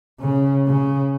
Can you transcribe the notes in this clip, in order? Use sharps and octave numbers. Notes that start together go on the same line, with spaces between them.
C#3
C#3